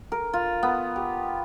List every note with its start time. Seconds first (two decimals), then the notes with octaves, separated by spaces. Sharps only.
0.12 A#4
0.33 F4
0.63 B3
0.96 G4